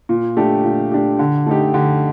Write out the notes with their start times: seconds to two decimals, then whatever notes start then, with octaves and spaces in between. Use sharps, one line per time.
0.09 A#2
0.37 A3 D4 G4
0.64 A#2
0.92 A3 D4 G4
1.19 D3
1.46 A3 D#4 G4
1.74 D3